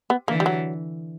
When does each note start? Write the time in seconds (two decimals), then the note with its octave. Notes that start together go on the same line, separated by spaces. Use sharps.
0.10 B3
0.28 D3 E3 A#3
0.40 G3
0.46 F#3